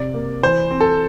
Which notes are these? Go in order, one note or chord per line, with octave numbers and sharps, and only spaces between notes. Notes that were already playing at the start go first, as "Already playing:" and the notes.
Already playing: C3 D5
A#3
E3 C5
C4
A4